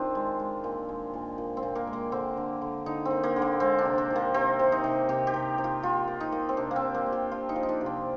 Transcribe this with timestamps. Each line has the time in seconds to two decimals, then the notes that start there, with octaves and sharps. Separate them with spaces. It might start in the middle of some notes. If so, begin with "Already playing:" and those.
Already playing: D#3 C4 D4 F4
0.15 G#3
0.40 G#3
0.64 A#2
0.89 G#3
1.14 A#2
1.38 A#2
1.57 C4
1.63 A#2
1.75 A#3
1.87 G#3
1.93 A#3
2.12 D3 C4
2.37 D3
2.61 D3
2.86 D3 D#4
3.05 C4
3.11 A#3
3.23 A#3
3.36 D3
3.42 A#3
3.60 G#3 C4
3.79 D4
3.85 C3
3.98 C4
4.10 D#3
4.16 A#3
4.34 C3 C4
4.59 C3
4.72 D#4
4.84 C3
5.09 C3 G4
5.27 G4
5.34 C3
5.58 C3
5.64 F4
5.82 A#3 F4
6.08 A#3
6.20 D#4
6.32 A#3
6.49 C4
6.57 C3 D4
6.71 A#3 C4
6.81 A#3
6.94 A#3
7.06 A#3
7.12 G4
7.31 F3 F4
7.49 D#4
7.56 F3
7.63 D#4
7.69 D4
7.81 C3
7.86 C4